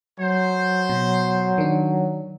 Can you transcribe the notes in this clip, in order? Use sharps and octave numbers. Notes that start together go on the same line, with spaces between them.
F#3 C5
B2
D#3 D4